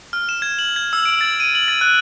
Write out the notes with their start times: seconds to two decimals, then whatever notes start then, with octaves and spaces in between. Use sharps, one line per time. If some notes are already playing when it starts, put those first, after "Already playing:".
0.13 F6
0.29 E7
0.42 G#6
0.59 F#7
0.76 G#6
0.93 E6
1.05 D7
1.21 A6
1.40 D#7
1.55 F#7
1.68 A6
1.81 F#6